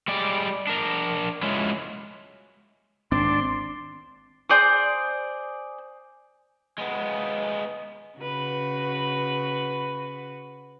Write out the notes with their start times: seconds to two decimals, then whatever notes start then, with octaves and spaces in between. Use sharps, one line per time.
0.08 G3 G#3 D5
0.67 D4 A#4
1.43 F#3 G#3 C#4 E4 F4
3.12 G#1 C4 D4 C6
4.49 G#4 C5 D5 D#6
6.78 G#3 B3
8.18 C#3 F#4 B4